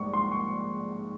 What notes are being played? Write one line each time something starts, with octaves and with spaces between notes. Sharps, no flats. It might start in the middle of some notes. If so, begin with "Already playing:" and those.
Already playing: A#1 G#2 G3 C#6
C6
C#6